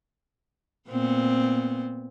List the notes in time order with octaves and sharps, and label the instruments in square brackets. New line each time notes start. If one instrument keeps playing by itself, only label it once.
[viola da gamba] A#2 B3 C4